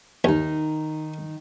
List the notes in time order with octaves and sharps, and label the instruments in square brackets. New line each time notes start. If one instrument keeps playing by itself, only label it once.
[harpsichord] D#2 [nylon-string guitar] D#3 D#4